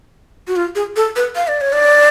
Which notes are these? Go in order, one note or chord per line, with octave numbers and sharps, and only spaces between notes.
F#4
F4
G#4
A4
B4
F5
D5
C#5
D5